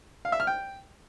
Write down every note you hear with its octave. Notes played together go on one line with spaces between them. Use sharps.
F5
E5
F6
G5